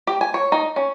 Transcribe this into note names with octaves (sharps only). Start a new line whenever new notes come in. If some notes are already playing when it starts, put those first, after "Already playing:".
G4
G#5
C#5
D#4
C#4